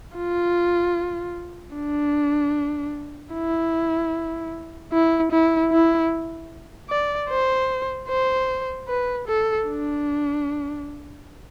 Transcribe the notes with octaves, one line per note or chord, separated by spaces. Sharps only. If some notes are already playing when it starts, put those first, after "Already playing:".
F4
D4
E4
E4
E4
E4
D5
C5
C5
B4
A4
D4